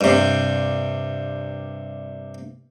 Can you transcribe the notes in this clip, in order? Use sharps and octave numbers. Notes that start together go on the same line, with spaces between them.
G2 C3